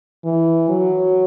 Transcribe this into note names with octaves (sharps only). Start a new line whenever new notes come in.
E3
F#3